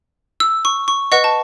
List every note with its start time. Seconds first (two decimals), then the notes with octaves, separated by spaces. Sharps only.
0.40 E6
0.65 C#6
0.88 C#6
1.12 B4 D#5 F#5 C#6
1.24 A5